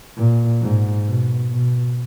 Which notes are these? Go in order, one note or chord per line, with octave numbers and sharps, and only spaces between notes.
A#2
G#2
B2
B2